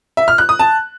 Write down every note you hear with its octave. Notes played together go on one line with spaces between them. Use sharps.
E5
F6
F#6
D#6
A5